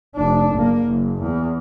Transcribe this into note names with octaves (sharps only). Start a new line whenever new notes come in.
F1 D4
F#1 A#3
F#1
E2